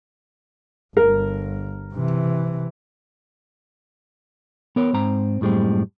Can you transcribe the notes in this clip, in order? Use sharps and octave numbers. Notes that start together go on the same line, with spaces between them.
G1 A#4
C3 E3
B3 A#4 C#5
G#2 C4 A#5
F#2 A2 G3 G#3 C4